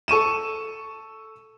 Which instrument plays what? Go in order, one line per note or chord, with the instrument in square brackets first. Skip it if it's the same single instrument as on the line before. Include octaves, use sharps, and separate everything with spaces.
[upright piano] A4 C#6 D#7 E7